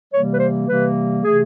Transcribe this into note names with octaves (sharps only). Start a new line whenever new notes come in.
C3 E3 G3 A#3 C#5
B4
C5
C3 E3 G3 A#3 B4
C3 E3 A3 G#4